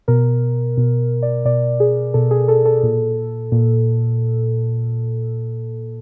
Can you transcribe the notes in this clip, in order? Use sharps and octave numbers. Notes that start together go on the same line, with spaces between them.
B2 A#4
B2
D5
B2 D5
G#4
B2 A4
G#4
A4
A4
A#2
A#2